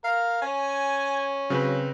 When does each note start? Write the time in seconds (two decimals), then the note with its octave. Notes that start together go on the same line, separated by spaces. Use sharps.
0.04 A#4 F5
0.42 C#4 G#5
1.50 C#3 F#3 C4 B4